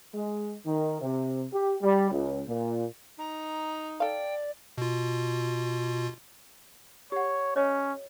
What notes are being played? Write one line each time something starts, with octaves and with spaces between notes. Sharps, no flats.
G#3
D#3
C3
G4
G3
C#2
A#2
D#4 A#5
A4 D5 F5 G5
B2 F4
G4 C#5 F#5
C#4 C#5 D#5